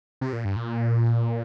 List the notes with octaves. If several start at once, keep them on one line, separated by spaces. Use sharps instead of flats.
C3
A#2
G2
A#2